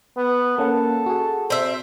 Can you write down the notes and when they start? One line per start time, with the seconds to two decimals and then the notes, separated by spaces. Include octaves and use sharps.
0.17 B3
0.58 A#3 C#4 A4 F#5
1.06 F#4 G#4
1.50 C4 E5